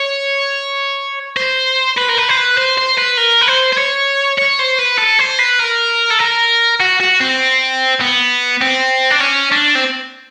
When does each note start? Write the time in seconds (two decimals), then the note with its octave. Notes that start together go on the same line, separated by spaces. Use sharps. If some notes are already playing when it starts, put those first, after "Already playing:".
Already playing: C#5
1.37 C5
1.97 B4
2.08 A#4
2.17 B4
2.29 C5
2.37 B4
2.57 C5
2.77 C5
2.98 B4
3.17 A#4
3.41 B4
3.48 C5
3.73 C5
3.78 C#5
4.38 C#5
4.59 C5
4.78 B4
4.98 A4
5.19 C5
5.39 B4
5.59 A#4
6.11 A4
6.19 A#4
6.80 F#4
7.00 F#4
7.20 C4
8.01 B3
8.61 C4
9.11 D4
9.21 C#4
9.52 D4
9.75 C4